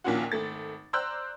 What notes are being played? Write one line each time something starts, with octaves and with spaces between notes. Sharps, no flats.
A#1 D#2 A#2 C#4 F4 F#4
G#1 A3 A6
C5 D5 A#5 E6 F#6 G6